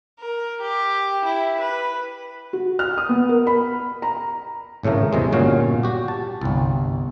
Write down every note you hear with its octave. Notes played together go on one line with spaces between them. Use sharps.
A#4
G4
E4
B4
F#4
F6
D#6
B3
A#4
B5
A#5
G#1 A2 C#3 A3 A#4
E2 C3 G#3
G1 A#2 C#4 F#4 F5
F#4 G4
A5
G1 C2